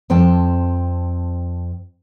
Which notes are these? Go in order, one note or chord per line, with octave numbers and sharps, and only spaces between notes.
F2 C4 G5 A5